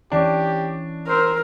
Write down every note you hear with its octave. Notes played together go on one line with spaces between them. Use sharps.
E3 C#4 D4 G4
A#4 C5 E6 C7